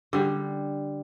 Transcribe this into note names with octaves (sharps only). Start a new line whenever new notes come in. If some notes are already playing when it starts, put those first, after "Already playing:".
D3 G3